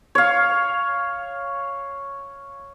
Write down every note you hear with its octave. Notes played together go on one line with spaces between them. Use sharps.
C#5 F5